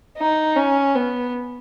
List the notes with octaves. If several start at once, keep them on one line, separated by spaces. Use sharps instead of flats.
D#4
C#4
B3